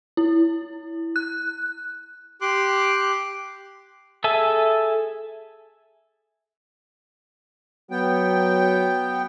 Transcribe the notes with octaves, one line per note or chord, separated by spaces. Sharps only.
E4
F#6
G4 C6 D6 F#6
G#4 A4 E5 G#5 A5
F#3 B3 G5